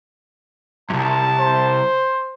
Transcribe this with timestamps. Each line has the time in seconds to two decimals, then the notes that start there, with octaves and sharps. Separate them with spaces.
0.90 C2 F#2 A5
1.40 C5